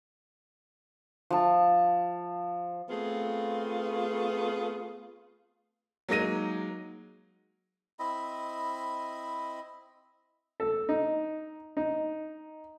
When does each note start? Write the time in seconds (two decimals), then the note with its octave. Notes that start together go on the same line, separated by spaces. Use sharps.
1.30 F3 A5
2.89 A3 B3 C4 F4 G#4
6.09 F#3 G#3 A#3 D#4 A#6 D#7
7.99 C4 E4 D#5 B5
10.60 A4
10.89 D#4
11.77 D#4